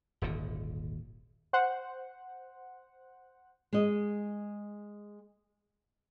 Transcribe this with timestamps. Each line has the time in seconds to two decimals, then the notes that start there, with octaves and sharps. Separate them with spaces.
0.22 D#1 G#1 D#2 D3
1.53 C5 F#5
3.73 G#3 D#5